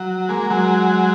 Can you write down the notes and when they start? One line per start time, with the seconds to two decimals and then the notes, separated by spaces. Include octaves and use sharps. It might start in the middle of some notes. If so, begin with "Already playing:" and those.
Already playing: F#3
0.29 G#3 A#3
0.50 F#3 G#3